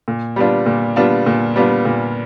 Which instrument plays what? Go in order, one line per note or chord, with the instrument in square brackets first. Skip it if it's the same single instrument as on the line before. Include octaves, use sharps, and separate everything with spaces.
[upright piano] A#2
G3 B3 D4 F4
A#2
G3 B3 D4 F4
A#2
G3 B3 D4 F4
A#2